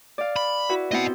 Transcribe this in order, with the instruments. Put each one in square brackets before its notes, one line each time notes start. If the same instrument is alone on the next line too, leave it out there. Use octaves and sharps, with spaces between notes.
[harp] D5 F5
[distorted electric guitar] B5
[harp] E4 F#4 B4
[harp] B3 C4 E4 [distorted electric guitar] D#5 F#5